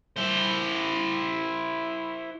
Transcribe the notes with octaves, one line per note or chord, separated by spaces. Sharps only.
E4 C5